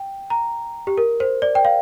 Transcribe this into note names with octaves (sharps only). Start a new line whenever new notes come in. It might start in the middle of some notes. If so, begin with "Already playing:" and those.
Already playing: G5
A#5
G4
A#4
C5
D5
G5
F5